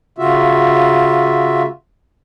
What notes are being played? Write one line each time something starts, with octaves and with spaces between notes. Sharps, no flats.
C#3 F4 F#4 E5